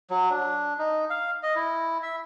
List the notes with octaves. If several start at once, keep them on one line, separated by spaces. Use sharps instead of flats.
F#3
D4
D#4
F5
D#5
E4
E5